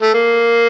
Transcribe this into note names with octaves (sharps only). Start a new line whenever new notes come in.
A3
A#3